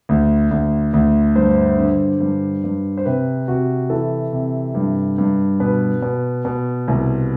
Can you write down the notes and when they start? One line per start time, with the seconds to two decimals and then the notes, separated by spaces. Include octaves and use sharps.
0.09 D2
0.51 D2
0.93 D2
1.35 G2 C5
1.79 D3
2.20 G2
2.64 G2
2.97 C5
3.05 C3 B4
3.48 C3 F#4
3.90 E3 A4
4.32 C3
4.75 G2
5.18 G2
5.60 B2 B4
6.02 B2
6.45 B2
6.88 C2